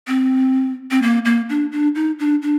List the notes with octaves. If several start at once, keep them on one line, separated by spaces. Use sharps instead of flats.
C4
C4
A#3
A#3
D4
D4
D#4
D4
D4